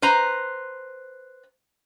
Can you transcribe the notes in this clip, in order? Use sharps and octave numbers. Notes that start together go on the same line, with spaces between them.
B4 C5 A#5